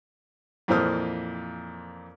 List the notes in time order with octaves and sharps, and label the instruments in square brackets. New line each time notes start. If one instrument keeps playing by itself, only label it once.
[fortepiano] F2 A#2 E3 C5 D#6 F6